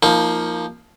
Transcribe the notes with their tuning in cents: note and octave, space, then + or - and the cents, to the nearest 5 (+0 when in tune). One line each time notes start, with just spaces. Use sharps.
F3 +0 A#3 +0 D#4 +30